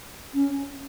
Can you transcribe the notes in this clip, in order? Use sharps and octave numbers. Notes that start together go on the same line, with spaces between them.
C#4